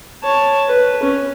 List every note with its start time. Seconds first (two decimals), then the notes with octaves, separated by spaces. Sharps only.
0.23 C#5 A5
0.68 B4
1.03 C#4